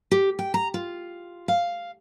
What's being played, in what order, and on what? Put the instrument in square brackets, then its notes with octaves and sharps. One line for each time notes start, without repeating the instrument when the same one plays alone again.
[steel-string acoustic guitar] G4
G5
A#5
F4
F5